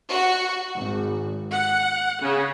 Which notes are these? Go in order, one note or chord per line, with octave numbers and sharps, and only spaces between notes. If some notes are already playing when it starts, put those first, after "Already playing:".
F#4
G#1
F#5
C#3